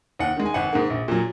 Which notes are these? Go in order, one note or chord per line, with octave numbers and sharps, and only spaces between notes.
D#2 F#5
D#3 G#3
G#5
G#1 F#5
G#2 D#3 A#3
A#1
A#2 F#3